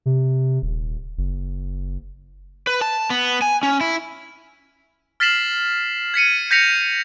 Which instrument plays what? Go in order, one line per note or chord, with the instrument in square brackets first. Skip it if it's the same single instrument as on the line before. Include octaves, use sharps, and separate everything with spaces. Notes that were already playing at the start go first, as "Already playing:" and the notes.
[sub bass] C3
D#1
F#1
[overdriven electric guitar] B4
A5
B3
G#5
C#4
E4
[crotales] F6 A6 B6 C7 E7 F#7
G#6 B6 C#7 D#7
G6 G#6 A#6 B6 C#7 F7